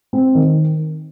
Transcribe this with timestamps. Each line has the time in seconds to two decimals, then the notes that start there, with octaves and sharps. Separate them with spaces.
0.13 C4
0.35 D#3